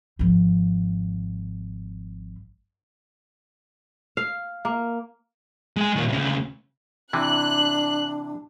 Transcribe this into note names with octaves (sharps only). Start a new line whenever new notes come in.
G#1 F3
F5
A#3
G#3 G#5
A#2 D#3
D2 C#3
C3 E3 D4 F#6